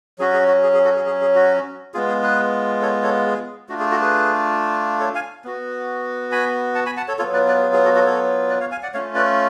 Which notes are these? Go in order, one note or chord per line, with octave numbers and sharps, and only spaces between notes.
F#3 C#4 F#4 G#4
G#4
F#4
G#4
G#4
F#4 A4
G#4
G#4
G#4
F#4
G#3 B3 F4 G#4
G#4
G#4 B4
A4 C#5
A4 C#5
G#4
A3 D4 F4 F#4
G#4
F#4 A4
G#4 B4
A4 C#5
F5 G#5
B3 F#4
G#5 B5
F#5 A5
G#5 B5
F#5 A5
A4 C#5
F#3 B3 F4 A4 C#5
B4 D5
B4 D5
G#4
G#4
F#4 A4
F#4 A4
A4 C#5
B4 D5
C#5 F5
F5 G#5
D5 F#5
A3 C#4 F4 C#5 F5
B4 D5